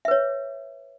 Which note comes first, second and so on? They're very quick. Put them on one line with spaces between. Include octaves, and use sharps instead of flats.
E5 B4 C#5